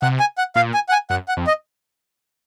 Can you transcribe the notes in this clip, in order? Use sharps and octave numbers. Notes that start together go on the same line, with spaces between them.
C3 F#5
G#5
F#5
A#2 F5
G#5
F#5
G#5
F#2 F#5
F#5
F2
D#5